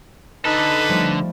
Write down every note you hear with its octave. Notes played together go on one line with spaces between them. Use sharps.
D3 D#4 A4 B4 B5
F3 G3 A3